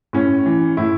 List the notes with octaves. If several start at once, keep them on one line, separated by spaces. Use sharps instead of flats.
A2 C#4
E3
A2 E4